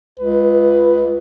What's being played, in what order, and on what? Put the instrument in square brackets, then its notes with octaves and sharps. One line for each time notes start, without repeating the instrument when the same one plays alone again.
[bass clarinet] C#2 [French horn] B4